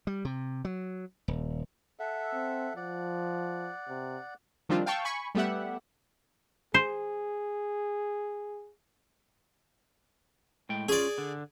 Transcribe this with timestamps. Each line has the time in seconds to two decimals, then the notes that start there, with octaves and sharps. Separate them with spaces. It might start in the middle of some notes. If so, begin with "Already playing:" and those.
0.07 G3
0.25 C3
0.65 F#3
1.28 D#1
1.99 A4 E5 F#5
2.34 C4
2.76 F3 D5 F#5
3.88 C3
4.69 D#3 F3 G3 C4 D4 F4
4.86 F5 G5 A5 C#6 E6
5.04 G#5 B5 C#6
5.35 G3 A3 B3 G4 E5 F#5
6.74 G#4 C5
10.69 A2 G#3 G5
10.89 C#4 F4 G#4 D5
11.18 D3